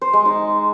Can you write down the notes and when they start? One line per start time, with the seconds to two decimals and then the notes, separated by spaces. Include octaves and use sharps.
0.01 C5
0.13 G#3
0.25 D#4